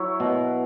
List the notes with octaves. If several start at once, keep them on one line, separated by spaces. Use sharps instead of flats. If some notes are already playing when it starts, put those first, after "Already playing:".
Already playing: F#3 E4 C#5
B2